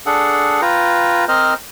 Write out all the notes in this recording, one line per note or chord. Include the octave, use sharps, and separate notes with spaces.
D4 G#4 A4 F#5
F4 B4 G5 A#5
C4 A#4 C5 D#5 F6